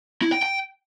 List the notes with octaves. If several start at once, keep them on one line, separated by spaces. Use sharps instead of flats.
E4
G5
G5